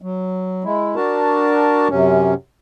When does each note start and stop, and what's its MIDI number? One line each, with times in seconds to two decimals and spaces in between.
0.02 0.64 54
0.64 0.96 56
0.64 0.96 64
0.96 1.88 62
0.96 1.88 66
0.96 1.88 70
0.96 1.88 81
1.90 2.34 42
1.90 2.34 48
1.90 2.34 61